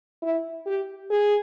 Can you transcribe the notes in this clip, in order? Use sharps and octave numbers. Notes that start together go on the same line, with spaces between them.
E4
G4
G#4